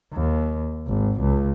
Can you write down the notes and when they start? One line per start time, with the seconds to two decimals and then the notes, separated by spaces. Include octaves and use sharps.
0.14 D#2
0.88 G#1
1.21 C#2